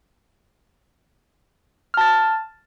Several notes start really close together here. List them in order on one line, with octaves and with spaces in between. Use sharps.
F6 A5 A6